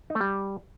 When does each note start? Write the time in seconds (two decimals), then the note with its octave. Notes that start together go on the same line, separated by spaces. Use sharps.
0.10 D#4
0.15 A3
0.21 G3